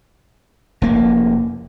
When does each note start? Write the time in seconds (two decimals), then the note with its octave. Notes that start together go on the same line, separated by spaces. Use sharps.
0.82 F1 A#3